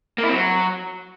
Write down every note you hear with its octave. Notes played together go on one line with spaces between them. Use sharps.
A#3
E4
C4
F#3